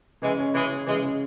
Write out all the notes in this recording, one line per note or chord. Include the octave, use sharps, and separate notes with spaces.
C#3 E3 G#3
C#4
C#3 E3 G#3
C#3
C#3 E3 G#3
C#3